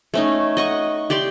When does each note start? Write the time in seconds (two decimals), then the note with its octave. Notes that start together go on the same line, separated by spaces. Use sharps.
0.14 A3 C#4 D#4
0.57 D#5 F#5 C#6
1.10 G4 D5 G5 C6